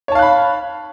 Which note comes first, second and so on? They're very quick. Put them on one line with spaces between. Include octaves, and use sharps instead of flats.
C#5 A5 F5 F#6 B5